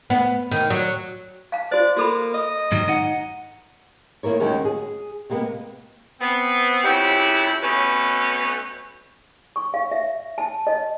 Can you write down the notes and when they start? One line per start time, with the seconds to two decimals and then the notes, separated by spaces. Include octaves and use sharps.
0.10 B3
0.51 D#3
0.70 F#3
1.52 F5 A5
1.71 F#4 C5 D5
1.97 A#3 F#4 A4 B5
2.34 D#5
2.72 G#2 D#3 F#3
2.88 D#4 F#5
4.23 D#3 A#3 E4 A#4 C#5
4.40 D#2 D#3 F#3 G#3 C#4
4.65 G#4
5.30 C3 G#3 A#3 B3
6.20 B3 C4
6.84 F2 C#3 C4 E4 G4 C#5
7.62 B2 A3 C4 C#4 B4
9.56 C#6
9.74 F5
9.92 E5
10.38 A5
10.67 D#5